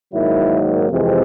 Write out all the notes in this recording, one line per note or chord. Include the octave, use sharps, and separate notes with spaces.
G#2 D#3 F#3 A#3 E4
F2 C3 E3 G#3 C4